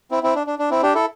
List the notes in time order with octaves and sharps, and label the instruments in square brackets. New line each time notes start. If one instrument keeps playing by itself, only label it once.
[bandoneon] C4 E4
C4 E4
D4
D4
D4
C4 E4
D4 G4
E4 A4